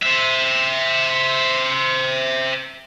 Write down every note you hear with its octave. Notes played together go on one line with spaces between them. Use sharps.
C5 E5